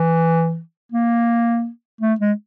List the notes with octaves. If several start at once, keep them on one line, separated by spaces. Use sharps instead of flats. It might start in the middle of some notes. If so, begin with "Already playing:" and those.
Already playing: E3
A#3
A3
G#3